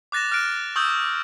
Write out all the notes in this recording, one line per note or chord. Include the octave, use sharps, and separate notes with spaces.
D6 F#6 A6 A#6 E7
F6 F#6 D7
C#6 D#6 E6 G6